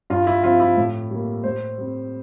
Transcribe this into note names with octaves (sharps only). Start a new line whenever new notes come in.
G2 F4
E4
F3 C4 F4
E4
A2
G3 A#3
A2 C5
G3 C4